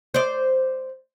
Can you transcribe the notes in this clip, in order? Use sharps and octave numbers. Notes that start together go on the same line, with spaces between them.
C5 D5